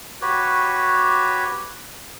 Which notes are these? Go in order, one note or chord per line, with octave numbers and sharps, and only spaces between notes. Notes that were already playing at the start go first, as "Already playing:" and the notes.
F#4 G4 B4 C#5